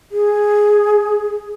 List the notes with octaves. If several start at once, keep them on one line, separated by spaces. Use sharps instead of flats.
G#4